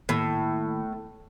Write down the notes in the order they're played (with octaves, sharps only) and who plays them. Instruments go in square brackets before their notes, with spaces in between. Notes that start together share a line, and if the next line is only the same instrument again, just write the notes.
[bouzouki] A2 [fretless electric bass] D#3 A#3 B3